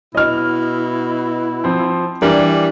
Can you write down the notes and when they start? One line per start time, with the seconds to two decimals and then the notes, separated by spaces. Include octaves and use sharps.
0.15 B2 E4 D#5 F6
1.64 F3 C4
2.22 E3 G3 D4 A#4